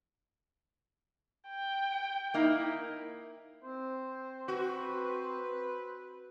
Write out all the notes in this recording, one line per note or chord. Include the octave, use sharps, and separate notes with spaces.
G5
A#3 D#4 E4
C4 C5
F#4 B4